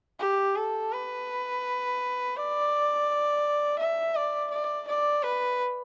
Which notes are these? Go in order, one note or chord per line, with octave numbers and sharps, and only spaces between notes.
G4
A4
B4
D5
E5
D5
D5
D5
B4